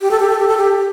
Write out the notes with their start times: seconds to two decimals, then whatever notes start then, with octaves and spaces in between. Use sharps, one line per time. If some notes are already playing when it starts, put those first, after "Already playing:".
0.01 G4
0.11 A4
0.20 G4
0.29 A4
0.39 G4
0.48 A4
0.57 G4